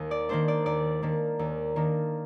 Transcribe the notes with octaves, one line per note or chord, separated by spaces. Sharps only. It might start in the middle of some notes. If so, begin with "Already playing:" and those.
Already playing: D#2
D5
D#3 A#3 D4 C5
D5
D#2 D5
D#3 A#3 D4
D#2
D#3 A#3 D4